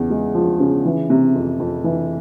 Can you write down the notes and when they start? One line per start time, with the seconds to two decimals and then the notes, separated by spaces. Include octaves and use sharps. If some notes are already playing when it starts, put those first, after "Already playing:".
Already playing: E2 C#3
0.10 G#3
0.35 F3
0.60 C#3
0.85 E3
1.10 C3
1.35 F2
1.60 F2
1.84 E3